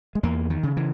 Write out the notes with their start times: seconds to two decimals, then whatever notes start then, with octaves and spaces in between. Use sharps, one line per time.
0.15 G#3
0.23 E2 A#3
0.50 D#3
0.63 C#3
0.77 E3